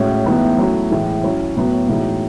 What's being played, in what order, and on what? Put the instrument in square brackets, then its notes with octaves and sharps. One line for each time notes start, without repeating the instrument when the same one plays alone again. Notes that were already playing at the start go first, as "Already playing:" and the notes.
Already playing: [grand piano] A2 G#3 C#4 F#4
A2 E3 G#3 B3 D#4
F#3 A3 C#4 E4
A2 E3 G#3
F#3 C#4 E4
A2 F#3 B3
A2 E3 G#3 D#4 F#4